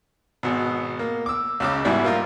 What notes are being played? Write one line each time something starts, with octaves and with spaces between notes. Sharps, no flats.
G#1 B2
A#3
D6 E6
C#2 C#3 D6
G#2 B2 G3 E4
A#3 F4 A#4